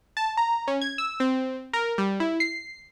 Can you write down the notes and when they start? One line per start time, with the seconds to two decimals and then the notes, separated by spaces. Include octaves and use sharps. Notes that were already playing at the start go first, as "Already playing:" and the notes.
0.17 A5
0.37 A#5
0.68 C#4
0.81 G#6
0.98 E6
1.20 C4
1.73 A#4
1.98 G3
2.20 E4
2.40 C7